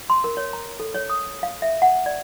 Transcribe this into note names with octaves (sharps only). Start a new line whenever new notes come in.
C6
A#4
C#5
A#5
A4
C#5
D#6
F5
E5
F#5
D5